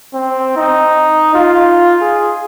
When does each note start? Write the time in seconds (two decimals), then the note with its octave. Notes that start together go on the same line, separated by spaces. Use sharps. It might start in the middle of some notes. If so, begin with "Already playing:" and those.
0.14 C4
0.57 D#4
1.35 F4
2.01 G#4